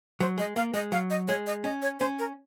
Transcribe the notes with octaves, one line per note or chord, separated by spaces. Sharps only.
F#3 C5
G#3 D#5
A#3 F5
G#3 D#5
F#3 F5
D#5
G#3 C#5
D#5
C#4 D#5
C#5
C#4 C5
A#4